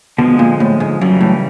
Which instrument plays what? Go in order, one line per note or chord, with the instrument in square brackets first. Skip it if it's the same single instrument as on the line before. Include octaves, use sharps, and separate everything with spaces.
[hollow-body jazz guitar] B2 [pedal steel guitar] D3 F3 G#3
[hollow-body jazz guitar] A#2
A2
G#2
[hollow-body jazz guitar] F#2 [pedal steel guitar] C#3 E3 G3
[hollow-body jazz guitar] A2